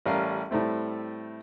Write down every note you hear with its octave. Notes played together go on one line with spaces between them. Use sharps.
A1 G3 C#4 A#4 F5
A2 G3 A3 C4